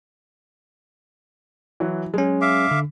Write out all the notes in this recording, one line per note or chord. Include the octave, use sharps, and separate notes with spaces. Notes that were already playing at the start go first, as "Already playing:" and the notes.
E3 F#3
F#3 G#3 C#4
E5 F5 D6
D3